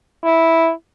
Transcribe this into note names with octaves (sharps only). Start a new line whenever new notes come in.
E4